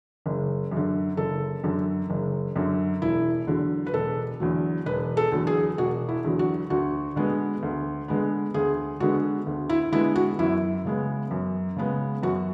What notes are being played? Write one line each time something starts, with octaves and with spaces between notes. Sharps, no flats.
F#1
F#2
D3
F#1 A4
F#2 D3
F#1
F#2 D3
E1 E4
E2 D3 F#3
B4
E1 A4
E2 D3 F#3
E1 B4
A4
E2 D3 F#3
G#4
E1 F#4
E4
E2 D3 F#3
F#4
D2 F#4
D3 G#3 B3
D2
D3 G#3 B3
D2 G#4
D3 G#3 B3 F#4
D2
E4
D3 G#3 B3 E4
F#4
F#2 E4
C#3 G#3 B3
F#2
C#3 G#3 B3
F#2 F#4